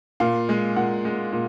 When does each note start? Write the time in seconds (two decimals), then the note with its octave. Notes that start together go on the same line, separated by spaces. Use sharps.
0.20 A#2 F5
0.49 G#3
0.76 A#2 F#5
1.05 G#3
1.32 A#2